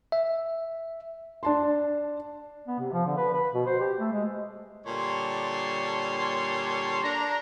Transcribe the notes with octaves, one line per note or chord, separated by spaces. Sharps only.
E5
D4 A5 C6
B3
C3
F3
D3
B4
B4
B2
C5
G4
A3
G#3
A#2 D3 G3 C#5 A5 C6
D4 A#5